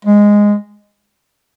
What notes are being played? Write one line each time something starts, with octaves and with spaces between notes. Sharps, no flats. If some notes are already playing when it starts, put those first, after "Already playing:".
G#3